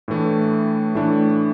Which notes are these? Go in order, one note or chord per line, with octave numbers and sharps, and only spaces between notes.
A2 E3 A3 D4
A2 E3 A3 D4